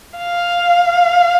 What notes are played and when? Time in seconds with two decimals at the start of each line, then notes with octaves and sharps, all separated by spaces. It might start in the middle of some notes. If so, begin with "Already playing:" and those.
0.18 F5